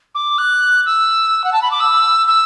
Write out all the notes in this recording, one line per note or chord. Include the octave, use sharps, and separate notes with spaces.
D6
F#6
E6
F#5
A5
B5
D6
E6
E6